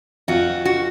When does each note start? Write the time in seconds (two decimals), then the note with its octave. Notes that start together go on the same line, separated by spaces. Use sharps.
0.28 F2 F#4
0.65 F#4